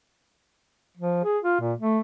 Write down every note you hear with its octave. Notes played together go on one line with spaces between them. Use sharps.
F3
G#4
F4
A#2
A3